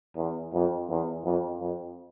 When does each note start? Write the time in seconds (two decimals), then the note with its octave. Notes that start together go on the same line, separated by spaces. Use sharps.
0.16 E2
0.53 F2
0.89 E2
1.25 F2
1.60 F2